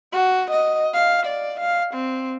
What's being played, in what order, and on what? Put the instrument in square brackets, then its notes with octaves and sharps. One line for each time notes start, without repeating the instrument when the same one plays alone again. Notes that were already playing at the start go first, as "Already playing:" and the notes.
[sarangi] F#4
D#5
F5
D5
F5
C4